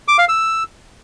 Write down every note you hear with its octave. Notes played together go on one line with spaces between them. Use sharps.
D6
F5
E6